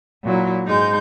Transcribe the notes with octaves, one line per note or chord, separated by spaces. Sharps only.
A#2 F#3 E4
G#2 G#3 D#4 G6